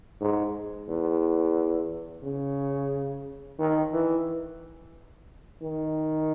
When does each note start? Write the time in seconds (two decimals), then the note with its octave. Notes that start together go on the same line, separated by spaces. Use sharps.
0.21 G#2
0.88 E2
2.24 C#3
3.59 D#3
3.93 E3
5.62 D#3